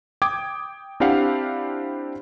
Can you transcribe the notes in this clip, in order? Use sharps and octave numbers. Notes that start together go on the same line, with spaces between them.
G5 D6 D#6 G#6
C4 D4 E4 G4 F5 F#5